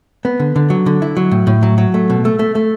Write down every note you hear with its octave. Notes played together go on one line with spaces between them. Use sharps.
B3
D3
D3
F#3
D3
E4
F#3
A2
A2
F#3
F#3
A3
B2
A3
A3
A3